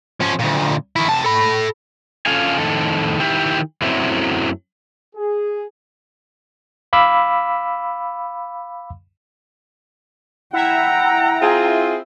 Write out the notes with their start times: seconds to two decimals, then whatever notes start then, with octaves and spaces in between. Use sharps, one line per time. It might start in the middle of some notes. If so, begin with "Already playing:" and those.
0.20 F3 C#4
0.39 D2 A#2
0.96 D#3 E4
1.08 C3 A5
1.24 A4 B5
2.26 D3 C#4 F4 A4 F5 G#5
2.58 F2 A2 D#3 A4
3.20 D#3 E4 G4
3.82 F#2 F#3 A3 C4 E4
5.16 G#4
6.93 F5 B5 D6 E6
10.53 E4 E5 F#5 G5 A#5
11.41 C4 F4 G#4